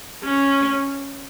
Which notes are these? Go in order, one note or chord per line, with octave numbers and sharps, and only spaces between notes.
C#4